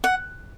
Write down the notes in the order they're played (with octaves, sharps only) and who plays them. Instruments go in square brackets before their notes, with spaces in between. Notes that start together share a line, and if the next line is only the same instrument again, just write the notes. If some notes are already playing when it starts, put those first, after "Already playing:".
[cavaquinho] F#5